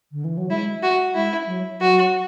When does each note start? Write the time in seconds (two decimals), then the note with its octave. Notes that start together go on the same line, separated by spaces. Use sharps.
0.12 D3
0.24 E3
0.37 F#3
0.50 G#3 E4
0.83 F#4
1.15 G#3 E4
1.47 F#3
1.80 F#3 F#4